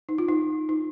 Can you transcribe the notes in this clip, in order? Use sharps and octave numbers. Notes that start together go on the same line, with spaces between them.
D#4
F4
D#4
D#4